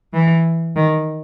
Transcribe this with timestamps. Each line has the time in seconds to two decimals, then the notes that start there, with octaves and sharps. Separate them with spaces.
0.14 E3
0.76 D#3